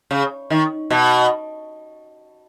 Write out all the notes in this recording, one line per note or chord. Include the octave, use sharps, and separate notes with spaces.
C#3
D#3
B2